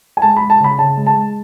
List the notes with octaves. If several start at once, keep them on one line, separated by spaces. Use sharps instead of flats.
G#5
G#3 A5
G#3 B5
A5
C#3 B5
C#3 A5
G#3
A5
G#3